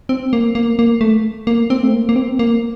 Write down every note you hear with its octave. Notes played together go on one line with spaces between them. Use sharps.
C4
A#3
A#3
A#3
A3
A#3
C4
A3
A#3
A#3
C4
A#3